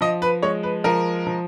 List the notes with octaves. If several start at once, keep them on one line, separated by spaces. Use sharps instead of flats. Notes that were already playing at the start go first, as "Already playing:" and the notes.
F3 D#5
B4
G#3 C#5
B4
F3 A#4
F3